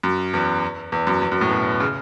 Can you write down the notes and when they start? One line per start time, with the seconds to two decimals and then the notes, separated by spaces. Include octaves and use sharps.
0.03 F#2
0.34 E2
0.92 E2
1.07 F#2
1.22 E2
1.32 F#2
1.41 A2
1.51 B2
1.80 C#3